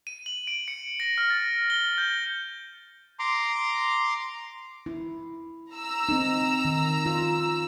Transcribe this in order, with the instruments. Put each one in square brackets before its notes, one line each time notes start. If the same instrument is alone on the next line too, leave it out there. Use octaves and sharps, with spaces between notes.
[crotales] D#7
F#7
D7
C#7
A#6
F6
A6
G7
G6
[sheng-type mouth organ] A#5 C6 D6
[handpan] E4
[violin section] A#5 E6
[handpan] C4 D#4
D#3
F4